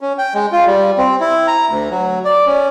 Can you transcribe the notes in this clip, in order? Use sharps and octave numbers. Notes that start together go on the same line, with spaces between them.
C#4
G5
G#3
F4
G3
C4
E4
A#5
D2
F#3
D5
C#4